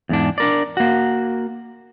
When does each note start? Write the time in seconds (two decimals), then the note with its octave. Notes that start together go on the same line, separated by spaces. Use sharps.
0.09 E2 G#2 D4
0.38 D4 A#4 D5
0.77 A#3 F#4